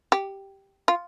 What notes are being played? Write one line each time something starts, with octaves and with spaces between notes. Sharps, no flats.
G4
F4